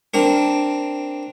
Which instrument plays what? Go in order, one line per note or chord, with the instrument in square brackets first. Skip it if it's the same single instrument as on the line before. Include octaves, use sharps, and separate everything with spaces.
[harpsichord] C4 D4 A#4